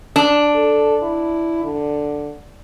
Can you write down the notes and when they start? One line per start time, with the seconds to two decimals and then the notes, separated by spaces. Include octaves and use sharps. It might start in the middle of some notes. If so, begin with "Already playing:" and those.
0.16 D4
0.55 A4
1.02 E4
1.64 D3